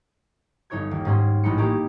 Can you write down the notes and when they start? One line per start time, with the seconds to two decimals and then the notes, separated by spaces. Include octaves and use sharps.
0.70 G1 D#4 C#5 C#6 G#6
0.91 D#2
1.05 G#2 C#4 G#4 C6
1.43 A1 G#3 D#4 B5 C#7
1.58 A#3 C#4 D#4 G4 G#4